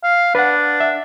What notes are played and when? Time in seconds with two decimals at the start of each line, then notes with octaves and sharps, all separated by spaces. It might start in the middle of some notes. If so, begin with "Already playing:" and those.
0.04 F5
0.35 D4 B4 F#5
0.80 E5